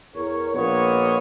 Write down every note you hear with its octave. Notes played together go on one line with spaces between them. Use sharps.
E2 A#4 C#5
A#1 A#2 A#3 B3 C#5 D#5